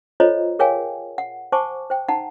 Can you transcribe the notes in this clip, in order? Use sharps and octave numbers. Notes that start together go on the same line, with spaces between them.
F4 A4 C5 C#5 D#5 A#5
G#4 A#4 C#5 F5 G5 G#5
F#5
C5 F#5 G#5 A5 C#6 D6
C5 G5
D#4 F#5 A5 A#5